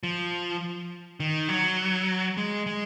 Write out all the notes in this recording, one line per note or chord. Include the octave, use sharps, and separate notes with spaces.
F3
D#3
F#3
G#3
G#3